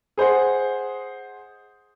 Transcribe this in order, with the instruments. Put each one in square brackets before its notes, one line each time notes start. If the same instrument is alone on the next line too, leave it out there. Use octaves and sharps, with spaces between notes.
[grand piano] G#4 C5 D#5 F#5